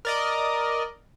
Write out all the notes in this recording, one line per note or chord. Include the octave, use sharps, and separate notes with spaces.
A#4 D5 D#5